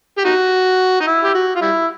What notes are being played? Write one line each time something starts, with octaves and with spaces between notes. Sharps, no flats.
G4
D#4 F#4
D#4
E4
G4
F#4
F4
G3 E4